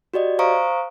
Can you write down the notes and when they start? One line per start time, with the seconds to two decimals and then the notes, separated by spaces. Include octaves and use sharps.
0.14 F#4 G4 D5 D#5
0.39 C5 F5 A#5 C#6 D#6 D7